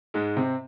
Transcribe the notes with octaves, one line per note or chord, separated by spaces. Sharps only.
G#2 G#3
C3 C4